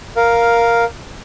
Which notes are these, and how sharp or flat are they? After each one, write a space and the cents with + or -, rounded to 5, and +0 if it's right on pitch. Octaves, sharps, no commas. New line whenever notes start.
A#4 +5 F5 +0